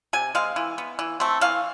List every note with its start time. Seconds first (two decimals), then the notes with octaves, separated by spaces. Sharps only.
0.13 C3 G#5
0.35 G#3 C4 F5
0.56 E3
0.78 B3
0.99 E3
1.20 A3 C4
1.41 E3 F5